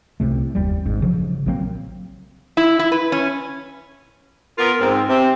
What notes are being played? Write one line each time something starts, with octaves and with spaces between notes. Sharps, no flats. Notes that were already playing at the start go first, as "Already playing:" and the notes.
C2 C3 A3
F#1 D#2 G3
G#1 G#2
C#3 F3 F#3
A#1 F#3 A#3 C4
E4
E4
B4
C#4
B3 F4 A#4
G#2 C4
C3 C4